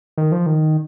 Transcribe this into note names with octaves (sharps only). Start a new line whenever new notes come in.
D#3
F3
D#3